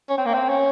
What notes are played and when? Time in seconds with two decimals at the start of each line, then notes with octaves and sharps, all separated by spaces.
0.10 C#4
0.18 C4
0.26 A#3
0.34 C4
0.49 C#4